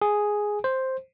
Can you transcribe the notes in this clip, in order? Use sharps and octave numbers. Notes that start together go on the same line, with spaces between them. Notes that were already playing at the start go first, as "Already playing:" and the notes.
G#4
C5